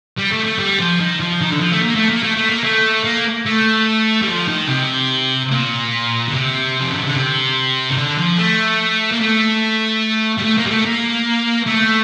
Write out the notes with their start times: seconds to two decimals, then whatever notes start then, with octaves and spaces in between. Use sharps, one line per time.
0.17 G3
0.31 A3
0.45 A3
0.58 G3
0.79 F3
0.99 D#3
1.20 F3
1.41 D#3
1.51 D3
1.61 F3
1.72 A3
1.82 A#3
1.95 A3
2.09 A#3
2.23 A3
2.36 A3
2.49 A#3
2.64 A3
3.05 A#3
3.46 A3
4.22 G3
4.28 F3
4.48 D#3
4.69 C3
5.51 A#2
6.28 D3
6.33 C3
6.80 F3
6.92 D#3
7.03 D3
7.15 C3
7.91 D#3
7.97 D3
8.18 F3
8.38 A3
9.12 A#3
9.21 A3
10.38 G3
10.43 A3
10.58 A#3
10.66 G3
10.71 A3
10.85 A#3
11.67 A3